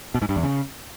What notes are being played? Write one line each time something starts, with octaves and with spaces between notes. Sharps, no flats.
B2
G#2
G2
E2
C#3